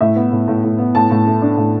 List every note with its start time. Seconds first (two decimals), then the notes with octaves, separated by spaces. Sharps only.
0.01 A2 E5
0.16 B3
0.32 A2
0.48 A2
0.63 A2
0.79 B3
0.95 A2 A5
1.11 A2
1.26 A3
1.42 D4
1.57 A2